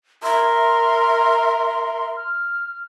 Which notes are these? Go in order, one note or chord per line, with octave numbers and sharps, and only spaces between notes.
A#4 E5 C6
F6